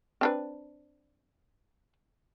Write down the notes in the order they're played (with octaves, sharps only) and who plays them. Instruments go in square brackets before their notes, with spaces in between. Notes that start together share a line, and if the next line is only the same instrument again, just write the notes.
[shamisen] C4 D4 B4